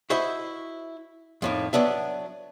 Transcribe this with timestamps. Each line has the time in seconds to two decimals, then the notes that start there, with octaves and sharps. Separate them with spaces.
0.10 E4 F#4 C5 D#5 E5
1.42 F2 A2 D#3
1.73 F#3 B3 D4 E5